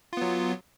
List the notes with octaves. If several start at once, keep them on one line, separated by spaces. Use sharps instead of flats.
F#3 B3 F4